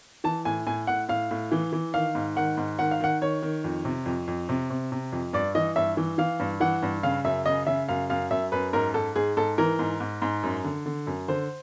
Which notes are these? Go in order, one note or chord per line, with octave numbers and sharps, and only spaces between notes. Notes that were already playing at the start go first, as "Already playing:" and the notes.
E3 A5
A2 G#5
A2 G#5
A2 F#5
A2 F5
A2
E3
E3
D#3 F5
G#2
D#3 F#5
G#2
D#3 F#5
F5
D#3 F#5
D#3 C#5
D#3
F2
C3
F2
F2
C3
C3
C3
F2
G2 D5
E3 D#5
G2 E5
E3
E3 F5
G2
E3 F#5
G2
C#3 F5
F#2 E5
C#3 D#5
C#3 E5
F#2 F5
F#2 F5
F#2 E5
F#2 B4
G#2 A#4
G#2 A4
G#2 G#4
G#2 A4
E3 A#4
G#2
G#2
G#2
F#2
D3
D3
F#2
D3 C5